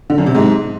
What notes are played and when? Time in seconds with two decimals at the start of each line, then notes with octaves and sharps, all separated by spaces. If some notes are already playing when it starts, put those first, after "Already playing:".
0.10 D3
0.18 F#2
0.26 C3
0.35 G#2